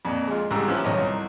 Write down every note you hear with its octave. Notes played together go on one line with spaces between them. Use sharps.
F2 A#2
G#3 F4
C2 G#2 C#3 G4 A#5 E6
F3 B3 C#4 E4 G4 B4
B1 D#3 C#5 D#5 A#5
C2